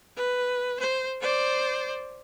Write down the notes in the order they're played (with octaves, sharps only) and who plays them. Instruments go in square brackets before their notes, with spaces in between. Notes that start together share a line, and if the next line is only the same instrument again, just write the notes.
[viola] B4
C5
C5 D5